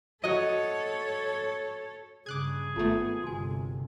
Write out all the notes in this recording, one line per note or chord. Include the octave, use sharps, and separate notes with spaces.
F#4 A4 C#5 D#5
G2 C#3 G#4 D6 F#6 G#6
G#1 A3 B3 F4 A4 A5
G1 C3 F#4 G#5